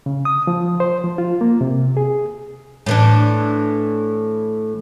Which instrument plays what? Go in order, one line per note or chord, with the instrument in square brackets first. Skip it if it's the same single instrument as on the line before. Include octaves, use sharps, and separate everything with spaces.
[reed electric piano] C#3
D#6
F3
C5
F3
F4
A#3
C3
G#4
[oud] A2 E3 D4